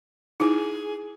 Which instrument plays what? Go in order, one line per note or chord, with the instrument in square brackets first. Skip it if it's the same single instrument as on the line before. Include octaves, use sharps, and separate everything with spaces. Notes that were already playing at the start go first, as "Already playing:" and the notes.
[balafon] D#4 E4 [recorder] G#4